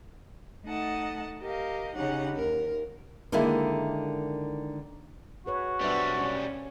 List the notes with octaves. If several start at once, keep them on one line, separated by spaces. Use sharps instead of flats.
A3 D#4 D#5 F#5 A5
G4 A#4 D#5 F5
C#3 C#4 D#4 G4 F#5
D#2 A#4
D3 D#3 G#3 A#3 E4
F#4 G#4 B4 C#5
B1 G3 B3 D4 B4 C5 E5
C#4